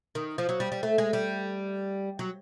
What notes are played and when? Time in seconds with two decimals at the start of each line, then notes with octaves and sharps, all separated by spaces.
0.15 D#3
0.38 F3
0.49 F#3
0.60 G3
0.72 G3
0.83 A3
0.98 G#3
1.13 G3
2.19 F#3